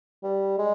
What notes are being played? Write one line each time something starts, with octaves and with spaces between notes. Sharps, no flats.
G3
G#3